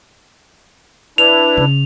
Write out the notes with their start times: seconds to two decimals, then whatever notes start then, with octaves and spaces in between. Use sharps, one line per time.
1.18 D4 E4 B4 F7
1.57 C#3